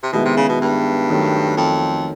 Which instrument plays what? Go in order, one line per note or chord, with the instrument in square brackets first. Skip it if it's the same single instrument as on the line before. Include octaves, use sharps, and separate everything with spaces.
[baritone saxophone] C3
[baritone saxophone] B2 [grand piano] D#3 G#3 B3 E4
[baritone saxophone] C3
C#3
B2
G2
[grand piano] D#3 F#3 A3
[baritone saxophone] F2